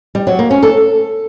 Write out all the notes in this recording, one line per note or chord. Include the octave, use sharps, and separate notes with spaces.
G3
F#3
A#3
C#4
A4